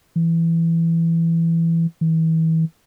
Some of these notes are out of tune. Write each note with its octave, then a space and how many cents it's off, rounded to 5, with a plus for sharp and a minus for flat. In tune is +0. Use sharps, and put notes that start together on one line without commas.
E3 +10
E3 -35